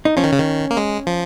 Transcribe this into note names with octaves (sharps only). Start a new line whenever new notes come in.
D#4
F3 C#4
D#3
C#3
D#3
A#3
G#3
F3